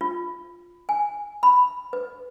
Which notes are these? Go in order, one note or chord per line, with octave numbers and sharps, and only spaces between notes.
F4
G#5
B5
B4